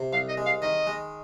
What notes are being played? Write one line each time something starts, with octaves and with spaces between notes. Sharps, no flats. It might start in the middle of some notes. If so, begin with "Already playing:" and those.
Already playing: C3
C2 F5
D#5
G#3
F5
D#3 D#5
G#3